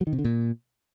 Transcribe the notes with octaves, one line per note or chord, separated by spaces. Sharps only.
F#3
D#3
C3
D3
A#2